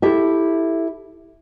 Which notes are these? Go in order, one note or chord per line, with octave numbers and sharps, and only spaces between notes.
E4 G4 A4 E5